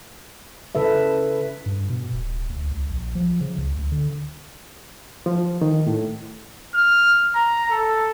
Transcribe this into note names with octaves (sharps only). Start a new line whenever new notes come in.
C#3 A4 B4 E5
G2
B2
D1
D2
C#2
A#1
F3
C#3
C#2
D2
D3
F3
D#3
A2
F6
A#5
A4